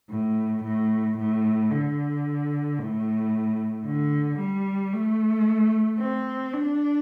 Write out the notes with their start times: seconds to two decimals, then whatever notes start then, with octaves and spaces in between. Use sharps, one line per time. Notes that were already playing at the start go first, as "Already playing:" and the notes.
0.10 A2
0.64 A2
1.18 A2
1.71 D3
2.79 A2
3.85 D3
4.39 G3
4.93 A3
6.00 C4
6.53 D4